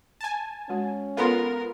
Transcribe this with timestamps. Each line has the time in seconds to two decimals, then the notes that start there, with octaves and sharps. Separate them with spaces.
0.21 G#5 A5
0.70 G#3 C#4 F#4
1.17 B3 F4 A4 A#4 A#5 C6